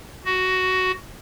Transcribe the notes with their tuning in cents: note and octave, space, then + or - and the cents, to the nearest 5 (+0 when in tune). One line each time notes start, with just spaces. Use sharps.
F#4 +10